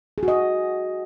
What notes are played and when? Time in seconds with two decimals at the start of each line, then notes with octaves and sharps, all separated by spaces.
0.18 G#4
0.23 F#4
0.28 D#5